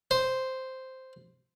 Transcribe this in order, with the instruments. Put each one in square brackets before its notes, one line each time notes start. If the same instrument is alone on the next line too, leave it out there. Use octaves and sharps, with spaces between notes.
[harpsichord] C5